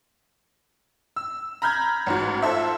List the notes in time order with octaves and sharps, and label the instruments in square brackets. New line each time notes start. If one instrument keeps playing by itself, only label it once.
[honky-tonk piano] E6
A#5 B5 F6 G6 G#6
A1 G#2 F#4
F4 A4 C5 E5